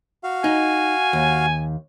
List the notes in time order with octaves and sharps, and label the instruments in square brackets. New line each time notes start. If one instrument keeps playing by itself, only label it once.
[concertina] F#4 F5
[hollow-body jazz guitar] D#4 [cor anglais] G#5
[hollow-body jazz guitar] D#2